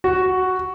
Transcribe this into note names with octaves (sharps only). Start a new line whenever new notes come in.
F#4